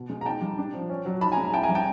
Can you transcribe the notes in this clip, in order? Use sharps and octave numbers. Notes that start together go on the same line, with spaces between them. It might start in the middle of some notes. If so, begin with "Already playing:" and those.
Already playing: B2
G#3
A#5
D#4 G5 A5
G3
D4
F3
C#4
F#3
D#4 A5 B5
G#5 A#5
G#3
A#5
E4 G5 A5
G#5 A#5
G3
G5 A5